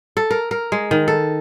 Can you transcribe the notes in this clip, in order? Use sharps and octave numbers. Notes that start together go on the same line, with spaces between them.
A4
A#4
A#4
G#3
D#3
A4